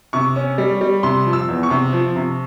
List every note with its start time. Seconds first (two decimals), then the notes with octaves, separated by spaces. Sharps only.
0.13 C3 C#6
0.36 C#4
0.58 G3
0.81 G3
1.03 C3 C6
1.26 F3
1.33 E6
1.48 E2
1.63 C#6
1.70 C3
1.93 F3
2.16 C3